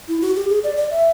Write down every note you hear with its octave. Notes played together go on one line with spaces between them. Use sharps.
E4
F#4
G4
G#4
D5
D5
E5